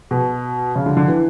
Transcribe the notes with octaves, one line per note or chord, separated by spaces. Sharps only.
B2
C#3
D3
D3
E3